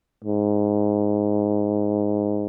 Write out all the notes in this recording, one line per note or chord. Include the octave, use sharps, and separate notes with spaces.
G#2